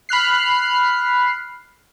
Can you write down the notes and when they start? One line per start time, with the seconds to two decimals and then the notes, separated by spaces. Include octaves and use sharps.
0.09 B5 F6 F#6 C7